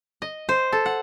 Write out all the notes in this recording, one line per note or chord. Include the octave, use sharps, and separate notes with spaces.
D#5
C5
A4
F#5